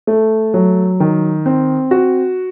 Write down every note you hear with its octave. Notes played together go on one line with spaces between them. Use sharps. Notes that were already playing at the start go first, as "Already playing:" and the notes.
A3
F#3
D#3
C4
F#4